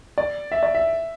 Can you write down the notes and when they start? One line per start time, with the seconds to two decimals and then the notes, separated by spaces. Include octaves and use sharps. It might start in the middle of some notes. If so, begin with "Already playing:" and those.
0.18 D5
0.52 E5
0.63 D5
0.75 E5